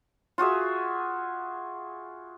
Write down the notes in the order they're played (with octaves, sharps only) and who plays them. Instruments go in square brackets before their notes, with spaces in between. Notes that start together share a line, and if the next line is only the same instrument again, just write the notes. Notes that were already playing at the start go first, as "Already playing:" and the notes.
[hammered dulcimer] F4 F#4 G#4 E5